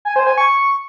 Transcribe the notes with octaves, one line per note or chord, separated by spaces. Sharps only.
G#5
C5
G#5
C#6